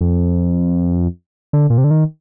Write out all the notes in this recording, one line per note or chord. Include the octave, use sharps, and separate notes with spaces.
F2
D3
A#2
C3
D3
D#3